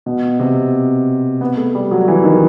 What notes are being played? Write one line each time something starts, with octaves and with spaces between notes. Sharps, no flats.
B2
C3
B3
A3
G3
F#3
E3
D#3